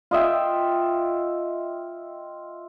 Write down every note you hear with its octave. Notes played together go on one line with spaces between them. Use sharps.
F4 D#5 E5 G5